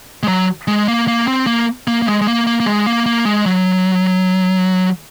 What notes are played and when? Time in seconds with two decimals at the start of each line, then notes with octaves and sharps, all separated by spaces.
0.23 G#3
0.28 F#3
0.68 G#3
0.88 A#3
1.08 A#3
1.28 C4
1.47 A#3
1.88 A#3
2.02 A#3
2.07 G#3
2.21 G#3
2.27 A#3
2.47 A#3
2.60 A#3
2.66 G#3
2.86 A#3
3.06 A#3
3.25 G#3
3.46 F#3